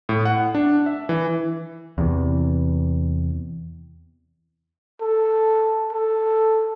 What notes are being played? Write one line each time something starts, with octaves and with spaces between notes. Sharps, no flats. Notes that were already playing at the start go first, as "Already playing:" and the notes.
A2
F#5
D4
E5
E3
E2 C3 E3
A4
A4